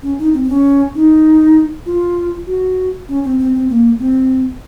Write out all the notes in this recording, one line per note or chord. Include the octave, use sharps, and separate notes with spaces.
C#4
D#4
C4
C4
C#4
D#4
F4
F#4
C#4
C4
C4
C4
A#3
C4